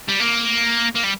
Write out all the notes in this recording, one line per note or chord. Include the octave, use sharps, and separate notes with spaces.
G3
A#3
A#3
G3